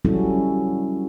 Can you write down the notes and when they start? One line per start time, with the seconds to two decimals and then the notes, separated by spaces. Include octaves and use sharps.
0.05 F#3 G3 C#4 E4 F#4 A4